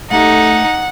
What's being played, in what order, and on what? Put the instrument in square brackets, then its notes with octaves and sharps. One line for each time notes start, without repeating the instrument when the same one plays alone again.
[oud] A3 G4 [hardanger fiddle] D#4 [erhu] F#5